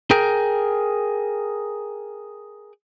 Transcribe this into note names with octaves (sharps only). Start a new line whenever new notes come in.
G#4 A#4 G5